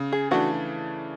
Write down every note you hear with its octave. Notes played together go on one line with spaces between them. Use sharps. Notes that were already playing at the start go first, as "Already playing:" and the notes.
Already playing: C#3
G#4
E3 A3 D4 F#4